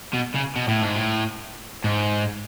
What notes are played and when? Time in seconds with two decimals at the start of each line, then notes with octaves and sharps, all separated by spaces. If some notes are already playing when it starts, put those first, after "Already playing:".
0.13 B2
0.34 C#3
0.56 B2
0.68 A2
0.82 G#2
0.96 A2
1.84 G#2